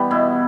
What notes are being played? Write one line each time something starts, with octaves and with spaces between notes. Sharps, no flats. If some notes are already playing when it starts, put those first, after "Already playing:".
Already playing: E3 G3 B3 G4
B2 E4